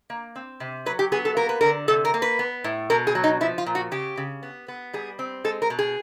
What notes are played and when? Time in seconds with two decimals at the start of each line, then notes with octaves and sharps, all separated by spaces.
0.10 A#3
0.36 C4
0.60 C3
0.86 F#3 B4
0.99 G4
1.12 B3 G#4
1.25 A4
1.37 A#3 A#4
1.49 B4
1.61 D3 A#4
1.88 C3 A4
2.05 A#4
2.14 A#3
2.22 B4
2.39 B3
2.64 A2
2.90 B2 A#4
3.07 G#4
3.15 F#3
3.24 D#4
3.41 F3 E4
3.58 F4
3.66 A#2
3.75 F#4
3.91 C#3 G4
4.17 C#3
4.43 B3
4.68 B3
4.93 G3 G#4
5.19 C4
5.44 G#3 A4
5.62 A#4
5.70 B2
5.79 G#4